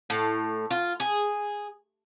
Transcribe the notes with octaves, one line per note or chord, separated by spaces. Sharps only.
A2
F4
G#4